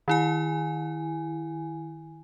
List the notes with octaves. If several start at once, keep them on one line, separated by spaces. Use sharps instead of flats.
D#3 E4 G#5